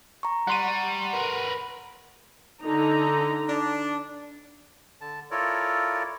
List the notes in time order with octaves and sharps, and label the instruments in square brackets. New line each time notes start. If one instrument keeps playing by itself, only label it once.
[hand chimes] A#5 C#6
[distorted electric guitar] G3 [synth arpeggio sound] F#5 C6 D#7
[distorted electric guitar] A#4 B4
[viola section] D3 D#4 A#5
[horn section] D4
[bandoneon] D3 A5
E4 F4 A4 A#4 C#5 D5